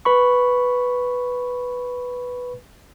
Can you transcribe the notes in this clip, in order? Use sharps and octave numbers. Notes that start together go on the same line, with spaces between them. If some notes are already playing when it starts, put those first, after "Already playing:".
B4 B5 C#6